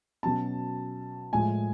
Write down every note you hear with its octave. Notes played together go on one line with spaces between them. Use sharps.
B2 F#3 C#4 A5
A2 F3 G#3 G#5